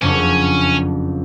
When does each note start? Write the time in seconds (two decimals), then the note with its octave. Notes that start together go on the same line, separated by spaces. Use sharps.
0.02 F#1 F2 C#4 D4